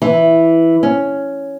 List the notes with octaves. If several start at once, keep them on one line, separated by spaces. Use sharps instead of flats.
E3
C#4